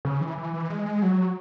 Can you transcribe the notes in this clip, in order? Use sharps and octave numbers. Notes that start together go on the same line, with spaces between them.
C#3
E3
E3
E3
G#3
G#3
F#3